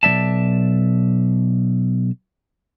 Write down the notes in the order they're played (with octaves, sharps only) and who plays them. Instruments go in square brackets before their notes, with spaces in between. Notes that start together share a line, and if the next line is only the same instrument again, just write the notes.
[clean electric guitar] B1 G#3 D5 E5 A5